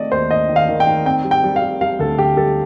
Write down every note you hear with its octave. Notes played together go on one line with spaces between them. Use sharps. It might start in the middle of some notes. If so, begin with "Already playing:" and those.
Already playing: D#3 A3 C4 D5 D#5
D#2 C5
D#3 D#5
D#3
F5
D#3
G5
D#3
C4 G5
G3
G5
G3
F5
G3
G3 F5
D2 A4
D3 G4
G3 A4